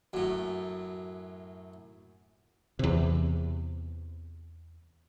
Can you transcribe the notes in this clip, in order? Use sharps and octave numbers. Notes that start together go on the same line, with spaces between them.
F#2 A2
E2 C3